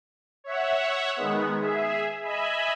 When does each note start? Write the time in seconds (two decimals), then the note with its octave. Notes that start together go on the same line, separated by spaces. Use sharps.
0.44 C#5 E5 F#5
1.16 D#3 G#3 B3
1.60 G#4 E5
2.22 D#5 E5 G#5 B5